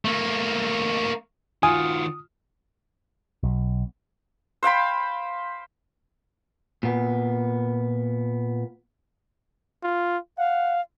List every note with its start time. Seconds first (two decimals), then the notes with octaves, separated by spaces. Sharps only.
0.05 A3 A#3
1.63 D#3 F4 F#4 G#5 D#6
3.43 B1
4.63 C5 F5 G5 B5
6.83 A#2 B3
9.84 F4
10.38 F5 F#5